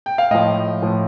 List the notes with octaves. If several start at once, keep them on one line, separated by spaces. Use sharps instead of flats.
G5
F5
A2 F3 D#5
A2 F3